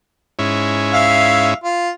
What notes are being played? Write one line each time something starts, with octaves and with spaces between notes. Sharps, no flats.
G#2 C#4 E4
E5 F5
F4